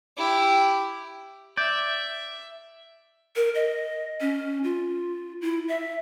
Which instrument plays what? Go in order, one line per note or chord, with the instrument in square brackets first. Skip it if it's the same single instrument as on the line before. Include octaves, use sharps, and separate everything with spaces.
[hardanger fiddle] E4 G4
[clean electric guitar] D5 [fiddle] E5 [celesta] G6 G#6
[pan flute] A#4
D#5
C#4
F4
E4
E5